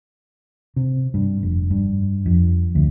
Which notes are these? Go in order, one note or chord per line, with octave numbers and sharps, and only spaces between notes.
C3
G2
F1
G2
F2
D2